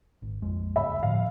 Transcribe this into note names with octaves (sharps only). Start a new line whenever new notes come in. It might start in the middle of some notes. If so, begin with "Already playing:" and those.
G#1
A#1 F2 G#3
D#1 G2 C#3 E5 B5
A2 D3 F3 F5